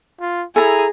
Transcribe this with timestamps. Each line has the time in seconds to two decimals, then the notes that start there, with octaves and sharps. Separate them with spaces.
0.20 F4
0.56 E4 G#4 A4 G#5 A#5